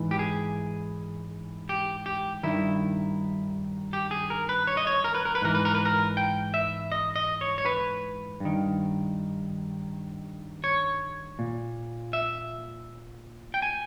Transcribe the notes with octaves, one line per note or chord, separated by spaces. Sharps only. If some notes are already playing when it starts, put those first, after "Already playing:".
Already playing: G#2 E3
G4
G#4
G4
G4
G2 D#3 E4
G4
G#4
A#4
B4
C#5
D#5
C#5
A#4
B4
A#4
B4
G#2 E3 A#4
B4
A#4
B4
A#4
G5
E5
D#5
D#5
C#5
C#5
B4
G2 D#3
C#5
A#2
E5
G5
G#5